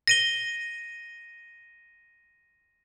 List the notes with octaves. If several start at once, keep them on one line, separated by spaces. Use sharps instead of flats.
A#6 D#7 G7